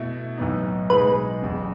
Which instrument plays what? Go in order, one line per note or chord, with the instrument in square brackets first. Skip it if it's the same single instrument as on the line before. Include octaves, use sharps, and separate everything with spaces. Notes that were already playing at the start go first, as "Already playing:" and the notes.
Already playing: [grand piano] B2 A3 E4
B1 A2 E3 B3 D#4
[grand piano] B1 B2 G#3 D#4 G#4 [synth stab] B4
[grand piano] F#1 E2 C#3